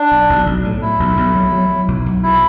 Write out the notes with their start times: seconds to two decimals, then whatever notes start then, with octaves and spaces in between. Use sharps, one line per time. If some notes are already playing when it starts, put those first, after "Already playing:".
Already playing: D4
0.11 B1
0.30 B1
0.46 B1
0.65 A2
0.82 A2 E4
1.00 B1
1.17 B1
1.35 F#3
1.52 F#3
1.70 F#3
1.88 B1
2.06 B1
2.23 B2 E4